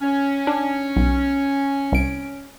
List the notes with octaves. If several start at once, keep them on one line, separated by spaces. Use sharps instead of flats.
C#4
D4
B1
C2 D7